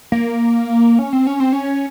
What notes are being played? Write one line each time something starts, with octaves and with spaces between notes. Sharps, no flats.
A#3
C#4
C4
C#4
C4
C#4